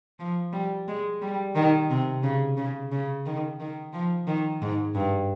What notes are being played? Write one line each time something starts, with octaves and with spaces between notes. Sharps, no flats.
F3
G3
G#3
G3
D#3
C3
C#3
C#3
C#3
D#3
D#3
F3
D#3
G#2
G2